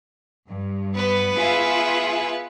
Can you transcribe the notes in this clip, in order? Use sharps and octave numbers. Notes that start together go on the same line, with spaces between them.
G2
B3 B4
F4 G#4 E5